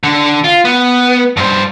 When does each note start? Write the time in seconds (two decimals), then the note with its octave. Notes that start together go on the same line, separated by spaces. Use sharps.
0.03 D3
0.44 F4
0.65 B3
1.37 G2 C5